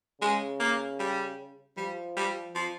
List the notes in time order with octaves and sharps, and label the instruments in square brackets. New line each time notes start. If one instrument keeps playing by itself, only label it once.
[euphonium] C#3 [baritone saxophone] G#3
[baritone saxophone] A#3
G3
[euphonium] F3 [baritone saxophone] G3
[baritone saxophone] G3
F3